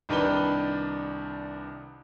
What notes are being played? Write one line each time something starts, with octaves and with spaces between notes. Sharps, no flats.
C2 D#3 D4 B4 B5 G7